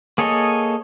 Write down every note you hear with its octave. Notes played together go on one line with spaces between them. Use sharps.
A#3 G#4 A4 C#5 D#5